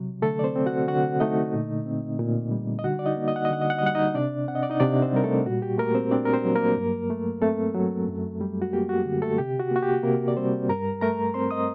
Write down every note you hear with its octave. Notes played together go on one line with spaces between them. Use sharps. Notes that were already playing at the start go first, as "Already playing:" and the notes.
Already playing: C3 F#3
D3 A3 A4
D5
C4 C5
C4
F#4 F#5
D3 F#4 F#5
A3 D#4 D#5
A#2
C4
A#2
G3
D#5
D3 F#4 F#5
D5
D#4 D#5
A#3
D#5
F#5
D#5
D3 F#5
D#5
F#5
D#5
G3 F#5
D#4 D#5
C3 D4 D5
C4 F#5
D#5
D5
D#4 D#5
C3 D4 D5
C4 C5
G3 A#4
A3 A4
A#2 F#4
G4
A3 A#3 A#4
C4 C5
C4 D4 D5
A#4
C4 C5
F#3
A#3 A#4
G2
A3
A3 C4 A4
F#3
F#2
G3
F#4
A#3 G4
F#4
D3
A3 A4
C3 G4
F#4
A#3 F#4
G4
C3 A#3 A#4
D5
G3 C4 C5
G2 A#4 A#5
A3 A#4 A#5
C4 C5 C6
D#5 D#6